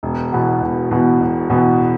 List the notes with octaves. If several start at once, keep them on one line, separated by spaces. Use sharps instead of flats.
E1
E2 B2 B3
E1
E2 B2 B3
E1
E2 B2 B3